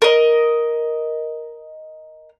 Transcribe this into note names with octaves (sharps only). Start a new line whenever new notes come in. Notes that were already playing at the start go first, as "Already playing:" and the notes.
A#4 D#5